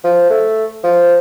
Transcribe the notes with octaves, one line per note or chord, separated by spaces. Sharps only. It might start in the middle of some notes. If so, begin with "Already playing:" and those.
F3
A3
F3